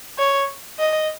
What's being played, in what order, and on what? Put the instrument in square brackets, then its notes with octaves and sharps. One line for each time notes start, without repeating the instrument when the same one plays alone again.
[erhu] C#5
D#5